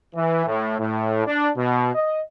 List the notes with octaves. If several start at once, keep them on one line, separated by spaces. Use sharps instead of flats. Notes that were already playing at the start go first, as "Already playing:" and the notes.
E3
A2
A2
D4
B2
D#5